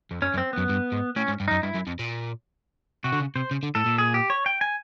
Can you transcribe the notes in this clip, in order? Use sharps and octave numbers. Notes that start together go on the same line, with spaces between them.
F2
F#2 C#4
F#2
C4
F#2 B3
G2
G#2
A2 C#4
G#2
G2
F#2 D#4
G2 E4
F#2
F2
A#2
C3 F#4
D3
C#3
C3 C5
C#3
D3
A2 A4
A#2
G#4
G4
C#5
G5
G#5